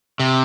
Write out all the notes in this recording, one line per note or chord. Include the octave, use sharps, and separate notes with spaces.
C3